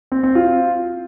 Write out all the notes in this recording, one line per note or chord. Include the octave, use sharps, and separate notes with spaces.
C4
C4
F4